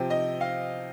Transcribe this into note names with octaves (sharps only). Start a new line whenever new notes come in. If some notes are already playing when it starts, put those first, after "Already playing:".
Already playing: C3 F3 C4 G5
D#5
F5